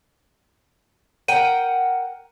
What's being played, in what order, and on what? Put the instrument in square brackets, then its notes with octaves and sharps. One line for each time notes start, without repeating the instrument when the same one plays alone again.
[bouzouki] A#4 F#5 G5 [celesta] D#7